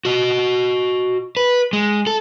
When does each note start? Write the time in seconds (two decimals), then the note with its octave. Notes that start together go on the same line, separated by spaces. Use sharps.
0.05 F#4 D#5
1.37 B4
1.73 G#3
2.07 A4